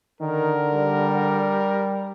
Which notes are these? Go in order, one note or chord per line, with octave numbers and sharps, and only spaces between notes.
D3 D#3 A#4
G3